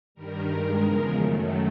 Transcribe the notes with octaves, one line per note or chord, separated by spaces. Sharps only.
G2 D#3 G3 A#4
G2 D#3 G#3
E2 C#3 F3 G#3
F#2 D#3 F#3 A3